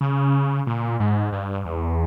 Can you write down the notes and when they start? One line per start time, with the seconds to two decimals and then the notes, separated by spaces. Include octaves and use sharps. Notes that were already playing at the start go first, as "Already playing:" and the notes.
0.01 C#3
0.67 A#2
1.00 G#2
1.32 G2
1.65 E2